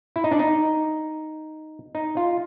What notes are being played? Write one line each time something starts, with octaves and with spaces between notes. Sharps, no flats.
E4
D#4
D4
D#4
D#4
F4